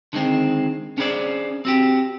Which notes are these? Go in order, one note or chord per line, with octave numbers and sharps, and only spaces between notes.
D3 D#3 G#3 C4
C#4 D4 G#4 A#4 C5 D5
C4 F#4 G4